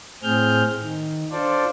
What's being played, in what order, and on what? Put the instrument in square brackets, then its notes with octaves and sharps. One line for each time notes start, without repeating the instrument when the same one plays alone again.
[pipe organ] A2 C4 G#4 F6 G6
D#3
D4 F4 A4 C5 D5